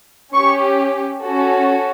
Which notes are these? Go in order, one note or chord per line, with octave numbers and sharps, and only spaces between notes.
C#4 G4 C#6
C#4 F#4 A4